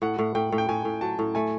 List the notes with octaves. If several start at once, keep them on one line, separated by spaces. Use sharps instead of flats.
A2 F#5
A2
A2 G5
A2
G5
A2 G#5
A2
F#3 A5
A2
A3 G#5